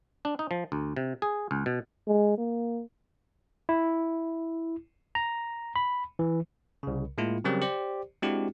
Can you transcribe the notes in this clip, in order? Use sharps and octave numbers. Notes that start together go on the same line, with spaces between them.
D4
D#4
F3
D2
C3
G#4
C#2
B2
G#3
A#3
E4
A#5
B5
E3
C2 C#3
A2 G#3 A#3 E4 F4
C#3 F#3 G3 C4 G4 A#4
G4 C5 D5
G#3 C4 D4 E4 F#4 G4